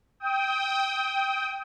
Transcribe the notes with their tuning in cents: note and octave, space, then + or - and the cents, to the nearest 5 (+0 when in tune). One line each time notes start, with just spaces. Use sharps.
G5 +0 D#6 +35